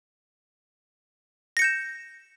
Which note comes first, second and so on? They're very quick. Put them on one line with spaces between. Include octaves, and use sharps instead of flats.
A#6 C#7 G6 E7